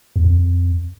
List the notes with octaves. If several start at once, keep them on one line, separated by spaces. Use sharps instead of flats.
E2
F2